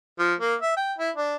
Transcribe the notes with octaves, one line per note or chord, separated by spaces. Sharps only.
F3
A#3
E5
G5
E4
D4